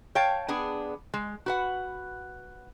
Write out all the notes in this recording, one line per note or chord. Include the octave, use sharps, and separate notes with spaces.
C#5 F5 G5 A5
B3 D4 G#4
G#3
F#4 B4 F#5